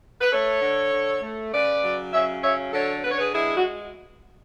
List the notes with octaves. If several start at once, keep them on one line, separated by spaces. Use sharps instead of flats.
B4
A3 A4 C#5
D3
D3
A3
C#3 B4 D5
F#3
C#3 C#5 E5
F#3 C#5 E5
D3 A4 C#5
D3 B4
C#5
G#4 B4
G#3 E4 G#4
F#4